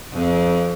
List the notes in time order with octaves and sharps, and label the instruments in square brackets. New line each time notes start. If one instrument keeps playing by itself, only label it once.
[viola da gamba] F2